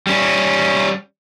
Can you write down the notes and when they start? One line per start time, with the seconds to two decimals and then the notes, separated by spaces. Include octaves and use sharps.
0.07 G3 C#4